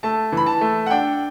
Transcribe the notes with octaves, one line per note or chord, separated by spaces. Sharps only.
A3 A5
E3 B5
A5
A3
F#5
D4 G5